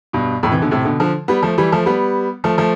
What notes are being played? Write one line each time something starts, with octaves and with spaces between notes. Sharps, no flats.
G2 B2
F2 A2
C3 E3
B2 D3
A2 C3
B2 D3
D3 F3
G3 B3
F3 A3
E3 G3
F3 A3
G3 B3
F3 A3
F3 A3